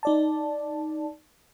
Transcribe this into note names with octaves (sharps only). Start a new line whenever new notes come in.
D#4 D5 A5